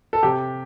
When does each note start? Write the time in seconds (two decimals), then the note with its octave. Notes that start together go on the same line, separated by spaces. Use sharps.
0.13 A4
0.23 C3 G4